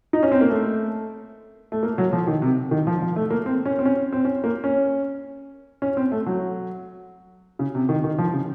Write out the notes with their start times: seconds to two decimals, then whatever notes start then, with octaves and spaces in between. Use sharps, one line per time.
0.13 D#4
0.23 C#4
0.32 C4
0.41 A#3
0.50 A3
1.72 A3
1.83 A#3
1.98 F#3
2.13 F3
2.27 D#3
2.42 C3
2.71 D#3
2.87 F3
3.02 F3
3.16 A3
3.31 A#3
3.46 C4
3.66 C#4
3.79 C4
3.85 C#4
4.12 C4
4.25 C#4
4.44 A#3
4.64 C#4
5.82 C#4
5.97 C4
6.12 A3
6.26 F#3
7.59 C#3
7.75 C3
7.89 D#3
8.04 D#3
8.18 F3
8.33 C#3